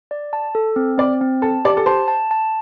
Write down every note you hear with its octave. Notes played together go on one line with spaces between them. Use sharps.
D5
A5
A4
C4
C4 D5
C4
A4 A5
G4 D5
A4
C5 A5
A5
A5